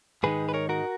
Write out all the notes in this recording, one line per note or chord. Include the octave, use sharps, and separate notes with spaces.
G#2 D#3 G#3 D#4 G#4 B4
B4
A#4 C#5
F#4 A#4